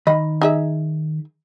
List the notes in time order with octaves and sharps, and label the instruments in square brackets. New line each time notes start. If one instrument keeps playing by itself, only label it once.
[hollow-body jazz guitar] D#3 B5 [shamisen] D#5
[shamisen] D#4 G#4 E5